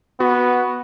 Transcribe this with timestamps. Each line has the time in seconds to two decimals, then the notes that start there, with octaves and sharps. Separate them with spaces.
0.20 B3 F#4